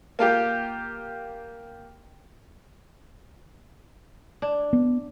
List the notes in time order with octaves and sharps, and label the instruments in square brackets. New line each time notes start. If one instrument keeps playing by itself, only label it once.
[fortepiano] A#3 F4 G4
[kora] D4
[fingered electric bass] B3